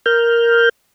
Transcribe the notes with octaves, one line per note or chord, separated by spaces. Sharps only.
A#4 F6 G6